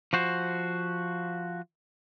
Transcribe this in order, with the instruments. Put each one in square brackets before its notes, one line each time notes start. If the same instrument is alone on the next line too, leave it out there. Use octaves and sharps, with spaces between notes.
[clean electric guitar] F3 F#4 C5